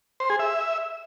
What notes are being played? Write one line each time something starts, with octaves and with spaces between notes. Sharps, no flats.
C5
G#4
E5